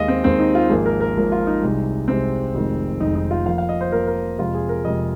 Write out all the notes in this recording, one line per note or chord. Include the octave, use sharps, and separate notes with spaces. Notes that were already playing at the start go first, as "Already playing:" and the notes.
Already playing: D#2 D#3 G#3 D#5 F5
C4
D#2 D#3 G#3 C4
D#4
F4
G#1 G#2 F3 A#3 G#4
A#4
A#4
G#1 G#2 F3 A#3
F4
D#4
C2 C3 G#3
C2 C3 G#3 C4
F1 F2 D#3 G#3
F1 F2 D#3 G#3 D#4
D#4
F4
F2 F3 A#3 F5
F5
D#5
C5
F2 F3 A#3 A#4
A#4
F2 C3 G#3 F4
G#4
A#4
F2 C3 G#3 D#5